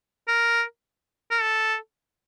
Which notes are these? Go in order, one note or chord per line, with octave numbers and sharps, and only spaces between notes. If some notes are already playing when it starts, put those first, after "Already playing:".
A#4
A#4
A4